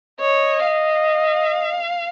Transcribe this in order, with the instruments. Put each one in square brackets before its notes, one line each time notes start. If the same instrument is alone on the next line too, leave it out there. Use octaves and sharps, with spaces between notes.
[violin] C#5 [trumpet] D#5
[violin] F5